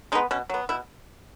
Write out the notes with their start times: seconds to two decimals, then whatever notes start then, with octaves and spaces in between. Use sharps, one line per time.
0.12 G#3 D#4
0.15 B3
0.31 B2 C#4
0.49 F#3 B3
0.69 B2 E4